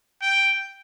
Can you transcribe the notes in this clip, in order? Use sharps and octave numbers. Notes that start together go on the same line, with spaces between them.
G5